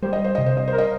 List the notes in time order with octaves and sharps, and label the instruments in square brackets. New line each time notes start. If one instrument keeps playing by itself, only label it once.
[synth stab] G3 [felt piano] C5
[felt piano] D#5
C5
[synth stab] C3 [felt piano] D#5
[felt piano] C5
D#5
[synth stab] A#4 [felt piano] C5
[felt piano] D#5